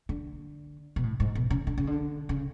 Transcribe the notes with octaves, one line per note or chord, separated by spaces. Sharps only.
D3
B2
A2
G#2
B2
C#3
D3
C#3
D3
C#3